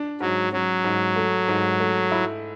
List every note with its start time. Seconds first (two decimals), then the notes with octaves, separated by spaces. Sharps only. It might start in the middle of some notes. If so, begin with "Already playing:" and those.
Already playing: D4
0.20 G#2 F#3
0.52 F#3 C#4
0.84 G#2
1.16 A3
1.48 G#2
1.80 A3
2.11 E4